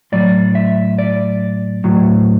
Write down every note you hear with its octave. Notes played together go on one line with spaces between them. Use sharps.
A2 F#3 D5
E5
D5
A2 F#3